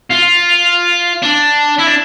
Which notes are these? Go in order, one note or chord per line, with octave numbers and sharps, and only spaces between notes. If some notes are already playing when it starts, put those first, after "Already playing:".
F4
D4
E4
D4